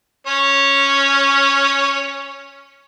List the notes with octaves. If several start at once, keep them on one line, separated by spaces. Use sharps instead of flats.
C#4 C#5